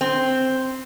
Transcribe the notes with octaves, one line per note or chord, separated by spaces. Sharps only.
C4